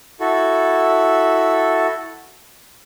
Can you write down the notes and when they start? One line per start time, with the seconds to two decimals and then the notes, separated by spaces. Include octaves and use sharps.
0.20 E4 F#4 A4